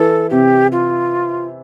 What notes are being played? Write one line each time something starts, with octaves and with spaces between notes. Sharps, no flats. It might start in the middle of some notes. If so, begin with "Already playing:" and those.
Already playing: E3 A4
C3 G4
F4